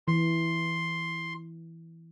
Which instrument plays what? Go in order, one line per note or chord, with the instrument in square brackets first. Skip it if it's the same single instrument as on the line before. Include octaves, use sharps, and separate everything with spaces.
[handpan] E3 [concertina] C6